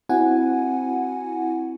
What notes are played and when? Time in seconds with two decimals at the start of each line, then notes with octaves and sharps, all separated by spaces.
0.09 C4 E4 F#4 F#5 G#5